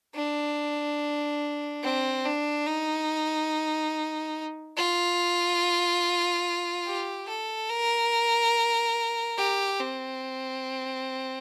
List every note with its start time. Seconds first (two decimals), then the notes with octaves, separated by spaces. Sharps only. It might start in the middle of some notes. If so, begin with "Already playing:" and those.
0.15 D4
1.83 C4
2.25 D4
2.67 D#4
4.77 F4
6.86 G4
7.28 A4
7.69 A#4
9.37 G4
9.80 C4